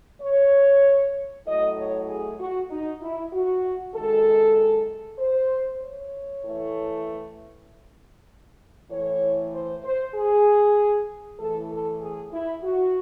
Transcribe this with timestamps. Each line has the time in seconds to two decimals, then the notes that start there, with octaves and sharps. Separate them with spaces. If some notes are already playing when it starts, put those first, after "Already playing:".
0.22 C#5
1.46 A2 F#3 A3 D#5
1.77 C#5
2.09 G#4
2.39 F#4
2.70 D#4
3.01 E4
3.33 F#4
3.94 F#2 D#3 G#3 A4
5.19 C5
5.81 C#5
6.43 A2 E3 A3
8.91 A2 E3 A3 C#5
9.53 C5
9.84 C5
10.15 G#4
11.39 A2 E3 A3 A4
11.70 A4
12.01 G#4
12.32 E4
12.63 F#4